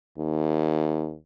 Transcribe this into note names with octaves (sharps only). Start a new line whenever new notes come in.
D#2